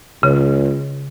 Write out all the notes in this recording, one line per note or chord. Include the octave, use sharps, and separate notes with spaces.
C#2 C#3